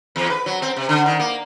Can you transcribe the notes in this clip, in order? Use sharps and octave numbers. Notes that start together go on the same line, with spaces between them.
E2
B4
F#3
C4
C3
D3
D#3
A#3